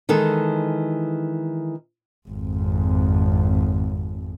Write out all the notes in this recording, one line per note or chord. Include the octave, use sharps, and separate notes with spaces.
D#3 E3 G#3 A4
G#1 F2